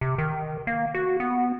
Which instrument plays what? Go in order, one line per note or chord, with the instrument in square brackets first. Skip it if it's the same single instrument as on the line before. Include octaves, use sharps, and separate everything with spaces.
[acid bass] C3
D#3
A#3
F#4
B3